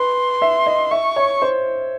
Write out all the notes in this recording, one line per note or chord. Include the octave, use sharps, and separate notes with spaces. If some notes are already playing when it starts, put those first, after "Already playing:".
Already playing: B4 C6
E5
D#5
E5 C#6
C#5
C5